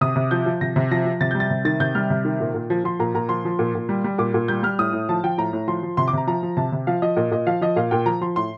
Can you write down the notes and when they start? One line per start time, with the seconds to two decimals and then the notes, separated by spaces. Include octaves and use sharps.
0.01 C3 D#6
0.16 C3
0.31 F3 G6
0.46 F3
0.61 C3 A#6
0.76 C3
0.91 F3 A#6
1.05 F3
1.21 C3 A6
1.31 G3 G6
1.40 A6
1.50 C3
1.65 D#3 A6
1.80 C3 G6
1.95 G3 F6
2.10 C3
2.25 D#3
2.40 A#2
2.54 A#2
2.70 F3
2.84 F3 C6
2.99 A#2 A#5
3.14 A#2 A#5
3.29 F3 C6
3.45 F3
3.59 A#2
3.75 A#2
3.89 G3
4.04 G3
4.18 A#2 D6
4.34 A#2
4.48 G3 G6
4.63 G3 F6
4.79 A2 D#6
4.93 A2
5.09 F3 A5
5.24 F3 G5
5.38 A2 A#5
5.53 A2
5.68 F3 C6
5.83 F3
5.97 C3 C6
6.08 D6
6.13 C3 A#5
6.27 F3 A#5
6.43 F3
6.57 C3 A5
6.72 C3
6.87 F3 F5
7.02 F3 D#5
7.16 A#2 D#5
7.31 A#2 D#5
7.47 F3 F5
7.61 F3 D#5
7.76 A#2 F5
7.91 A#2 G5
8.06 F3 A#5
8.21 F3 C6
8.36 A2 C6